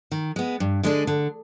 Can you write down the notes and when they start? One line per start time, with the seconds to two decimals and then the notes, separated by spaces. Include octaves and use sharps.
0.11 D#3
0.36 G#3 B3
0.60 G2
0.83 D3 G#3 D4
1.07 D3